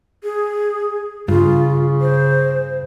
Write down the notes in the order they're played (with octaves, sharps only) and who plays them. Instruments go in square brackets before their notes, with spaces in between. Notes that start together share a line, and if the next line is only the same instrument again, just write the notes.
[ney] G#4
[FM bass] G2 [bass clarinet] C#3 [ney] F4
[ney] C5